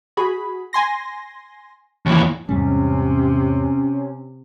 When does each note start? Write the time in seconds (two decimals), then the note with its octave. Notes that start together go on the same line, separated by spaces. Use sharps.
0.17 F#4 G#4 B5
0.73 G#5 C6 A#6
2.06 D#2 E3
2.49 E2 G#2 C3 G3 C#4